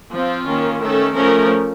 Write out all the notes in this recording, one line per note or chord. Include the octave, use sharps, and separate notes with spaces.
F3 C4 F4
D#3 A#3 C#4
D#3 A3 C#4 A4
F3 A3 C#4 A#4